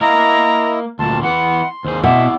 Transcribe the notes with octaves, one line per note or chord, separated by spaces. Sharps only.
A#3 E4 A#4 D#5 A#5
D2 A#2 A5 C6
E3 B3 F#5
D#2 G#4 C5
B2 E4 D5 E5